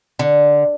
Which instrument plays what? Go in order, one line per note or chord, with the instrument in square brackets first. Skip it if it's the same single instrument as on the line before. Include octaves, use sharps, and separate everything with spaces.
[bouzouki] D3